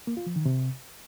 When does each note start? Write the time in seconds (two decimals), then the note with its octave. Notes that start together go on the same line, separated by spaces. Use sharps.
0.07 A#3
0.17 F4
0.26 F3
0.36 D#3
0.46 C3